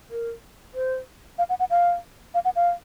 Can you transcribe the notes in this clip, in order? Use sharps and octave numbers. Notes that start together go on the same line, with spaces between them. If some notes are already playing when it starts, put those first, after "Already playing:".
A#4
C5
F5
F#5
F#5
F5
F5
F#5
F5